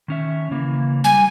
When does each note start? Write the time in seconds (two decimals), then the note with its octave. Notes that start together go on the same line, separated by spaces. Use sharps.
0.08 D#3 C#4 E5
0.51 C#3 E3 A#3
1.04 G3 G#5